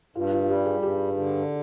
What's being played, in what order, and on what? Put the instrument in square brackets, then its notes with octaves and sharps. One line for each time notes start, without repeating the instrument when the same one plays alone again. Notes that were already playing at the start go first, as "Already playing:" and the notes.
[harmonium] G2 [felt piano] F4
[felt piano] F4
F4
[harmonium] G3 [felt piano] G4
[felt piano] G#4
[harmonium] G2 [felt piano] G4
[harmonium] D3